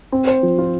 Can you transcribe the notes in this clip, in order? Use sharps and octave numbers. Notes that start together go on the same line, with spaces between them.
C4
C5
F3
F4